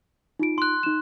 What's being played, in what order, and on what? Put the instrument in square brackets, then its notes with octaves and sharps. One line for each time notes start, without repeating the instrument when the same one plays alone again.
[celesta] D#4 F4 D7
[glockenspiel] C6 F#6
[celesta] D#4 E7